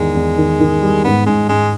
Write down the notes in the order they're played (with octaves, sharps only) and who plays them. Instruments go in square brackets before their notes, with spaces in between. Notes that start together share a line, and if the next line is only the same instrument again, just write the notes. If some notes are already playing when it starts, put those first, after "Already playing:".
Already playing: [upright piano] E2 D#3 [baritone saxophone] G#3
[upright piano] E2
D#3
D#3
G3
[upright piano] G#2 [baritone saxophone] B3
[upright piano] G#2 [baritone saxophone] G#3
[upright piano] G#2 [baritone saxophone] G#3